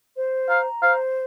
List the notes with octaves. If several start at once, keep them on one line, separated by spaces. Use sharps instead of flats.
C5
F5 A#5
C5 F5